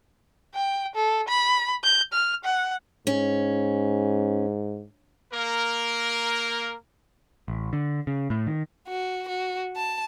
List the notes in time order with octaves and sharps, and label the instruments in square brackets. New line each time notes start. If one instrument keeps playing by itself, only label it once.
[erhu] G5
A4
B5
G6
F6
F#5
[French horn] G#2 [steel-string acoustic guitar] C#4
[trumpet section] A#3 A#4
[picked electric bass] A1
D3
C#3
A2
D#3
[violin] F#4
F#4
A5